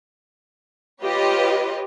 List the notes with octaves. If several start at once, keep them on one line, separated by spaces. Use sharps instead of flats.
F4 G4 B4 C#5 D#5